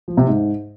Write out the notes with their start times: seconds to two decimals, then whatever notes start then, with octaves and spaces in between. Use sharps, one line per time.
0.08 F3
0.17 C3
0.27 G#2